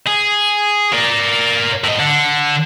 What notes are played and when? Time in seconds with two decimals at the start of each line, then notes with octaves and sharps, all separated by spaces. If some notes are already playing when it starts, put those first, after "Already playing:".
0.07 G#4
0.93 A#4 D5
1.84 A2 D#5
1.99 D3